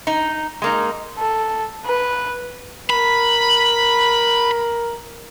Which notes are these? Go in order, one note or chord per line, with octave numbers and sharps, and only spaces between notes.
D#4
G#3 A#3 D#4
A4
B4
A#4 B5